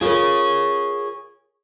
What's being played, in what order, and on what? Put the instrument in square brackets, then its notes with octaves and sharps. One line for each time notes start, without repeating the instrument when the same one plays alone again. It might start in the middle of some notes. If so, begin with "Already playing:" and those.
[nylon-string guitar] F4 A#4 [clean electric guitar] G#4 C#5